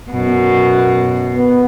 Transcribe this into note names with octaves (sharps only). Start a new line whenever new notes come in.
F#2 B2
B3